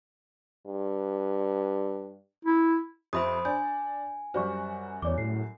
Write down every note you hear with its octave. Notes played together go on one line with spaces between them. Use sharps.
G2
E4
F2 F3 G4 C5 E5 B5 D#6
D4 G#5 G6
F#2 G3 F#4 C5 D5 C#6
E2 C#5 D5 D6
A2 C7